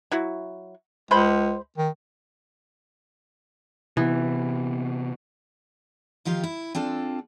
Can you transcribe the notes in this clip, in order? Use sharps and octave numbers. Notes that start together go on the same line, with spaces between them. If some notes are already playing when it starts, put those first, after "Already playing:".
F#3 E4 F#4
C#2 G#3 C5 B5
D#3
C3 E3 B3
D#3 F3 F4 G4 F5
E4
C4 D4 F4 A4